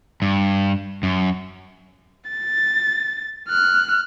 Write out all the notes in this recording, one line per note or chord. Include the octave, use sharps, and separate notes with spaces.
G2
F#2
A6
F6 F#6